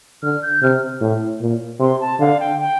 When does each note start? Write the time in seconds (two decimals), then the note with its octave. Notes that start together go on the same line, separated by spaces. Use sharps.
0.22 D3 F6
0.42 G6
0.62 C3 F6
1.01 A2
1.41 A#2
1.80 C3 C6
2.00 A5
2.19 D3 F5
2.39 G5
2.59 G5